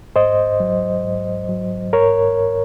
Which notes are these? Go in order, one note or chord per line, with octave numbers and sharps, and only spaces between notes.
G#2 C5 D#5
F#3
G#2
F#3
G#2 A#4 C#5